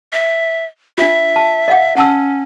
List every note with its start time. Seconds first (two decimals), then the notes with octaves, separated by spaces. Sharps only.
0.13 E5
0.98 D4 F4 E5
1.36 A5
1.68 D#5 F5 F#5
1.97 C#4 F#5 A5 E6